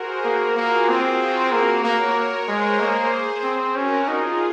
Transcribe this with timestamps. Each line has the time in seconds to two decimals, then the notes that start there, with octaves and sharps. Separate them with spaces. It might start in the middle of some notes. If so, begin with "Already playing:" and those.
Already playing: F#4 G#4 A#4 C5
0.24 A#3 F#4 A#4
0.57 A#3 F4 G#4
0.89 C4
1.20 F#4 A#4
1.52 A#3
1.84 A#3 A#4 C#5
2.48 G#3 G#4 C5
2.79 A#3 G#4 C5
3.43 C4
3.75 C#4 F#4 A#4
4.07 D#4 F4 G#4